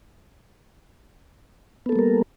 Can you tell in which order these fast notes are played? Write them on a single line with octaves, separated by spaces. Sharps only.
B3 A4 A#3 G3 A#4